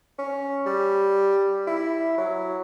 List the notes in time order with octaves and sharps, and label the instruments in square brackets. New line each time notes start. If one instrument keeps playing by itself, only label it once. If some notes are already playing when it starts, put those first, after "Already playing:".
[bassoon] C#4
G3
E4
F#3